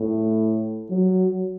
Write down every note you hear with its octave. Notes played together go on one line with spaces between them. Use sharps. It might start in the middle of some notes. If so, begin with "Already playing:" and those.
Already playing: A2
F#3